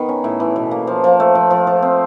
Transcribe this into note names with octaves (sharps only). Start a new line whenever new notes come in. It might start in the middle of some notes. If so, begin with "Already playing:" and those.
Already playing: D#3 B3
C#4
A2
E3
B2
A#3
F3
F3
A3
F3
F3
F3
C4